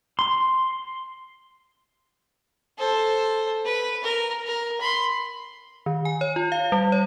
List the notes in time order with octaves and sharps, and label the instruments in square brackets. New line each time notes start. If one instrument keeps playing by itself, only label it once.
[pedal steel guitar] C6
[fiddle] A4 C5
B4
A#4
A#4
B5 C6
[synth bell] D#3
G#5
C#5
F4
F5
G3
C#5